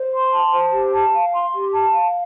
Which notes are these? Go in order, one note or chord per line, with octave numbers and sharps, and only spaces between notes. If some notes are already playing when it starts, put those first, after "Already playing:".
Already playing: C5
C6
A5
C5
G4
A5
F5
C6
G4
A5
F5